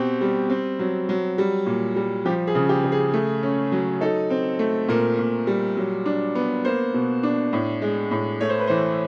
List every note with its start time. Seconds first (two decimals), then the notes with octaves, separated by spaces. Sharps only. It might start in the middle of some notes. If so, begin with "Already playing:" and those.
Already playing: B2 C4 G4
0.21 G3
0.50 C4
0.79 F#3
1.09 F#3
1.38 G3
1.66 A#2
1.96 G3
2.25 F3 G4
2.47 G#4
2.55 C#3
2.69 G4
2.84 C#3
2.92 G#4
3.14 A3
3.43 C#4
3.72 F#3
4.01 D#4 A4
4.30 C4
4.59 A3
4.88 A#2 A#4
5.19 A#2
5.47 G3
5.77 F#3
6.06 D4
6.35 B3
6.65 A#3 C5
6.94 B2
7.23 D4
7.53 A2
7.82 G#3
8.11 A2
8.41 A3 C#5
8.49 C5
8.59 B4
8.67 E3 C5